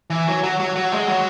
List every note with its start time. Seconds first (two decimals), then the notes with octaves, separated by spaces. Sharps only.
0.10 E3
0.27 F#3
0.43 F#3
0.60 F#3
0.76 F#3
0.92 G#3
1.08 F#3